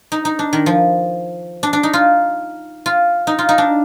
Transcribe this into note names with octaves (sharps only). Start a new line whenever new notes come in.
D#4
D#4
D4
D#3
F3
D4
D4
D#4
F4
F4
D#4
F4
D#4
D4